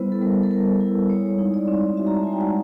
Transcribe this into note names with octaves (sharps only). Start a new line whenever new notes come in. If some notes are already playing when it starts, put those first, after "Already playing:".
Already playing: G3 B3 E4 B4 C5
A4
G3 A#4
A4
G3 A#4
E4
G#3 C#5
D#4
D5
C4
F#4 E5
A#5
A5
G#3 G#5
G5
F#5